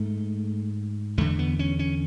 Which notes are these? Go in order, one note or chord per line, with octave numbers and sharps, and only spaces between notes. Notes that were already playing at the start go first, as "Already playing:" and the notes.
Already playing: G#2 A3
E2 D3 A3
B3
C#4
C#4